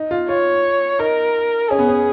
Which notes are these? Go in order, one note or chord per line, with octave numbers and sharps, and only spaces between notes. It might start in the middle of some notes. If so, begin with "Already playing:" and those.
Already playing: D#4
F4
F4 C#5
D#4 A#4
C#4 G#4
B3
C#4